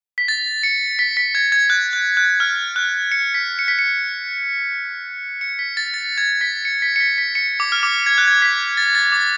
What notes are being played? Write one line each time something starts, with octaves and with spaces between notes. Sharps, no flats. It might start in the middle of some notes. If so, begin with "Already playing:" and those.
B6
A6
C#7
B6
B6
G#6
G#6
F#6
F#6
F#6
F6
F#6
C#7
B6
C#7
B6
C#7
C#7
B6
A6
A6
G#6
B6
C#7
B6
C#7
B6
B6
C#7
D6
F6
D6
G#6
F#6
G#6
B6
A6
A6
D6